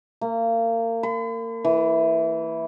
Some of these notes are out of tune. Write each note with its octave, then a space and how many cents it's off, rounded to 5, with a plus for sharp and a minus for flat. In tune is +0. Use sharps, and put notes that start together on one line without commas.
A#3 -30
B5 +45
E3 -5